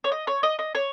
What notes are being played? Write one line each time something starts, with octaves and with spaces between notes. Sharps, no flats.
C#5
D#5
C#5
D#5
D#5
C#5